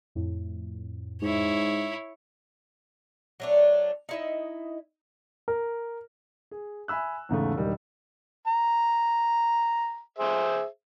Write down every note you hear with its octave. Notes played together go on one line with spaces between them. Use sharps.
F2 A2
G#2 E4 C#5
F#3 A3 D4
D#4 E4 D#5
A#4
G#4
E5 G#5 B5 E6 F#6
E2 G#2 C#3 A3
E1 D#3 G3 D#5
A#5
G#4 C5 E5